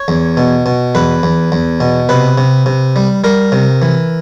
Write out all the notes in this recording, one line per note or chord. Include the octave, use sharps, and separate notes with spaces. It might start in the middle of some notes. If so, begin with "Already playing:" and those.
Already playing: C#5
E2
B2
B2
E2 B4
E2
E2
B2
C3 B4
C3
C3
G3
G3 A#4
C3
E3